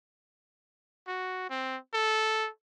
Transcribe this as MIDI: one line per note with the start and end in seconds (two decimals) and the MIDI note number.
1.07 1.47 66
1.50 1.77 60
1.94 2.49 69